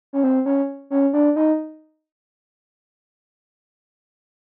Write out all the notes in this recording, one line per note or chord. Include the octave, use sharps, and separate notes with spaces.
C#4
C4
C#4
C#4
D4
D#4